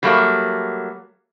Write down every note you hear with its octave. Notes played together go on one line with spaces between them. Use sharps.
F#3 G3 A3 A#3